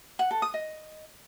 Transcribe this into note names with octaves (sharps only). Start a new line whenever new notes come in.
F#5
A4
D#6
D#5